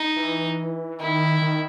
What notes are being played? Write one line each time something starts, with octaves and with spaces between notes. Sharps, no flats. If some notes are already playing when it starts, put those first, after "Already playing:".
Already playing: D#4
E3
D#3 E4
D#3